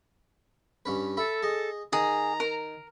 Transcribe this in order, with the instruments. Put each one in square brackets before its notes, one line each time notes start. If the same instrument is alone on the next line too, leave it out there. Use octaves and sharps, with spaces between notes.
[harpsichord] G2 C#4 B4
[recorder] A4 [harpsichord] E5 B5
[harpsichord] G#4 D#5
[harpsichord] D#3 [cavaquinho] G#4 [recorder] A#5
[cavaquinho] A#4